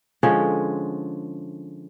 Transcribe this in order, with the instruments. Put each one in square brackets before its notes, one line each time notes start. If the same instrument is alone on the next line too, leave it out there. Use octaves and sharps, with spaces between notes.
[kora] D3 F3 G#3 C#4